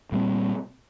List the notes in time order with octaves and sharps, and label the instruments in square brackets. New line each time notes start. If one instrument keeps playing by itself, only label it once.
[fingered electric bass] A#2 G3 C4